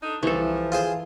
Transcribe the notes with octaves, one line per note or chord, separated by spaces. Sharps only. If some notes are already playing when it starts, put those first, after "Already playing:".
D4 D#4 A4
C2 E3 F3 A4
F4 G#4 C5